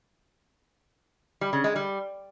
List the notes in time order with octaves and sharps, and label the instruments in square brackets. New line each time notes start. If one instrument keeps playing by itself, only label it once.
[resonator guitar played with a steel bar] G3
C#3
G#3
G3